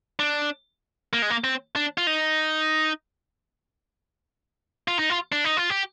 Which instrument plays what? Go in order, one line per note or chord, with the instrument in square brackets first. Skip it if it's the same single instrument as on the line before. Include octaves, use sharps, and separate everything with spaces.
[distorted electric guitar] D4
A#3
G#3
A#3
C4
D4
F4
D#4
F4
D#4
F4
D4
D#4
F4
G4